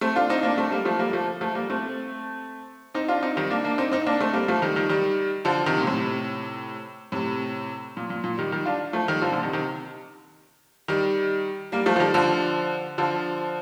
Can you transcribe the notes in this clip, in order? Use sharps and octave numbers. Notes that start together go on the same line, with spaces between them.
A3 C4
D4 F4
C4 D#4
A#3 D4
A3 C4
G3 A#3
F3 A3
G3 A#3
F3 A3
F3 A3
G3 A#3
A3 C4
C4 D#4
D4 F4
C4 D#4
D#3 G3
A#3 D4
A#3 D4
C4 D#4
C4 D#4
A#3 D4
A3 C4
G3 A#3
F3 A3
D#3 G3
D#3 G3
D#3 G3
D3 F3
C3 D#3
A#2
A2 C3
A2 C3
A#2
A#2
A#2
D#3 G3
D#3 G3
D4 F4
F3 A3
D#3 G3
D3 F3
A#2 D3
C3 D#3
C3 D#3
D#3 G3
G3 A#3
F3 A3
F3
D#3 G3
D3 F3
D3 F3